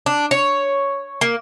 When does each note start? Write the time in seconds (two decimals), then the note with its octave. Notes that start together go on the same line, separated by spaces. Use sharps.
0.06 D4
0.31 C#5
1.21 A#3